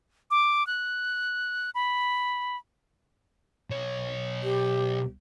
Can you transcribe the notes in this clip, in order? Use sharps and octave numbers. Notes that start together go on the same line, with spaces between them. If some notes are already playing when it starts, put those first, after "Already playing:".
D6
F#6
B5
B1 C#5
G4